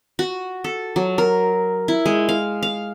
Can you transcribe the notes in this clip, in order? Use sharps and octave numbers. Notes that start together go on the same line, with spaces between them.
F#4
A4
F#3
A#4
E4
G#3
F5
F5